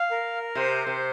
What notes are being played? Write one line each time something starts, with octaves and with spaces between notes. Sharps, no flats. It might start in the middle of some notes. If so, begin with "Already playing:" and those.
Already playing: F5
A#4
C3 C5
C3